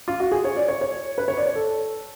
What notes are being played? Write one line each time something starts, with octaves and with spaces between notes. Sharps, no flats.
F4
F#4
G#4
C#5
D5
C#5
C#5
B4
C#5
D5
C#5
A4